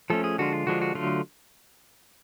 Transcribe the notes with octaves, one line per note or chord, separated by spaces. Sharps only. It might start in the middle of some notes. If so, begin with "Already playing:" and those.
F3 A3 C#4 A4
G#4
D3 F3 G#3 D4 F4 F#4
F4
D3 F3 G#3 D4 F4 F#4
F#4
D3 F#3 A3 F4